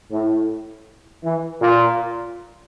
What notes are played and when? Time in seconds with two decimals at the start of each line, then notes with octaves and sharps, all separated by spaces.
0.11 A2
1.24 E3
1.61 A#2